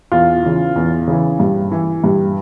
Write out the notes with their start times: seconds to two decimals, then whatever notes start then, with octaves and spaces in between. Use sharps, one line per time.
0.12 E2 F4
0.43 C#3 E3
0.76 E2
1.08 C#3 E3
1.39 G2
1.72 E3
2.04 G2